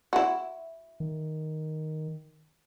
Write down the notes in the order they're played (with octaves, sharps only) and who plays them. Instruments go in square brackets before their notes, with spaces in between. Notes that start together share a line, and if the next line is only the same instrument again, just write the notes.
[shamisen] E4 F#4
[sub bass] D#3